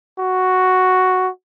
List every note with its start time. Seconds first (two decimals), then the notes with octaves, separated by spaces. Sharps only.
0.19 F#4